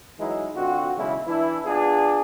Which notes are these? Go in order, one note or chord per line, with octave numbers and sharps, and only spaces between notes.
E3 F#3 G#3 D#4 E4
D3 C4 F4 F#4
B1 E2 C#3 G#3 E4
E3 D4 E4
B3 D4 F4 G#4